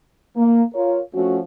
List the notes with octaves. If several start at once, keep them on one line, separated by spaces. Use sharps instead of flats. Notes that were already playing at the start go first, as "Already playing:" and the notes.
A#3
F4 A#4 C#5
F3 A3 C#4 F#4